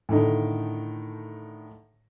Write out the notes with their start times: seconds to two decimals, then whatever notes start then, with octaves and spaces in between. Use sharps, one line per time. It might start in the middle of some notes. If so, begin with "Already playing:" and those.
0.09 A2 D3 D#3 D#4